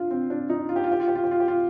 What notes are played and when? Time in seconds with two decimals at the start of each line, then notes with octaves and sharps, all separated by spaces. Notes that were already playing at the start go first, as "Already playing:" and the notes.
Already playing: D4 F4
0.11 C4
0.30 D4
0.50 D#4
0.69 F4
0.76 G4
0.84 F4
0.92 G4
1.00 F4
1.08 G4
1.15 F4
1.24 G4
1.31 F4
1.40 G4
1.48 F4